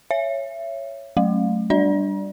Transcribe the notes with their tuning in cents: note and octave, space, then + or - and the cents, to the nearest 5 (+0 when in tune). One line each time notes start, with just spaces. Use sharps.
C#5 +0 E5 +25
F#3 +15 A3 -10
G3 +0 D4 +0 D5 -5